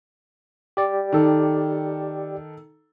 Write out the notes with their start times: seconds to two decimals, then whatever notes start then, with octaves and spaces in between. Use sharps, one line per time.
0.77 G4 D5
1.12 D#3 A4